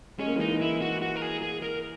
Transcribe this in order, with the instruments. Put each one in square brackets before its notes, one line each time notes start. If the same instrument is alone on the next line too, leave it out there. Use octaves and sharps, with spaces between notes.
[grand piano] G#3 [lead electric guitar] C#4
[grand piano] A#3
[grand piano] E3 G#3 [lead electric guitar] D#4
[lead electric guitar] E4
F#4
F#4
A#4
G#4
G#4
A#4